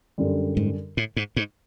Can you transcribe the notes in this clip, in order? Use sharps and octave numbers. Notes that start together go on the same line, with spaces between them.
F#2 D3 G3
G#2
A2
G#2
G#2